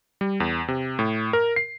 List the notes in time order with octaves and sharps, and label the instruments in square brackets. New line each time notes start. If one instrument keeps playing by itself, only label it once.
[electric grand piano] G3
E2
C3
A2
A#4
C7